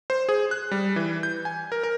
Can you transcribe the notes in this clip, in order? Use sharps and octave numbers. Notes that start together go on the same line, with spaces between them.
C5
G#4
F#6
G3
E3
G6
G#5
A#4
A#4